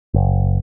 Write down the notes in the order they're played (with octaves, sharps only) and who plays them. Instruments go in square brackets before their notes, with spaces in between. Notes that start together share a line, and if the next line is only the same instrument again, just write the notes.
[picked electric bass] F#1